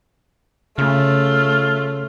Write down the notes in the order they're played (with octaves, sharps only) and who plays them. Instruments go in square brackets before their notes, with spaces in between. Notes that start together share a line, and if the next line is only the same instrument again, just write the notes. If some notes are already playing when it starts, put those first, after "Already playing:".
[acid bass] C#3 [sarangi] A3 [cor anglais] F4